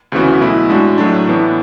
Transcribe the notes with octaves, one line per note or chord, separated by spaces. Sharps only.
D2 C#3 E3 B3 F#4
B1 B2 A3 E4
A2 G#3 D4 F#4
A2 F#3 A3 D4
A2 E3 B3 D4